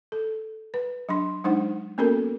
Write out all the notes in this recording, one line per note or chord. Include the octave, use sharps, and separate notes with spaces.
A4
B4
F#3 D4 C6
F#3 G#3 D4 D#4 C5 F#5
A#3 B3 C#4 F#4 A4 A#4